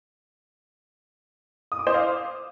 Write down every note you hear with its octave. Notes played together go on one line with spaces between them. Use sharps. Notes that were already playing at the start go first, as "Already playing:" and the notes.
D#6
D6
C5
F5